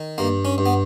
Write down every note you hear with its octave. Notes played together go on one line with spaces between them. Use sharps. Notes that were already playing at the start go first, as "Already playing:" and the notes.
Already playing: D#3
G2 A#3
C#4
G2
B3